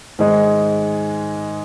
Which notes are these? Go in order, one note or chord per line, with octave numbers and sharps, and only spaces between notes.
G#2 D#3 G#3 D#4